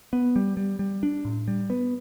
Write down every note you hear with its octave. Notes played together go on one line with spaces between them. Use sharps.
B3
G3
G3
G3
D4
A2
G3
B3